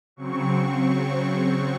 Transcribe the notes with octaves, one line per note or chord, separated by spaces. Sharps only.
C#3 F#3 C4 C#6